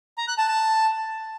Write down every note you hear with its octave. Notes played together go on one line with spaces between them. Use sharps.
A#5
F#6
A5
A5